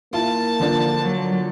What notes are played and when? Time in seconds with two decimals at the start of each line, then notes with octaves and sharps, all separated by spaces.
0.13 A#3 E4 F4 A5
0.60 D3 F3 D4
1.03 F#3